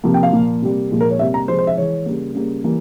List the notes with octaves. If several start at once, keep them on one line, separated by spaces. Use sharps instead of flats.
C3 F3 A#3
G5
F5
A#2 F3 A#3
C3 G3 A#3
A#2 F3 G#3
A#4
C#5
C3 G3 A#3 E5
A#5
C3 F3 G#3 C5
C5
E5
E3 G#3 C#5
C#3 G3 A#3
C#3 G3 A#3
E3 G3 A#3